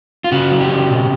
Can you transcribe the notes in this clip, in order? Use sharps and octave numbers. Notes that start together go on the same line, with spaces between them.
F4
C#3 F#4
F#3
G4
C#3
B2